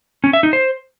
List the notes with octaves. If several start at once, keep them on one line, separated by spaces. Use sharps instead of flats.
C#4
E5
D#4
C5